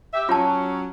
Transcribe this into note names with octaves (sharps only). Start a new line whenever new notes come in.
G4 E5
F#3 C#4 F4 A5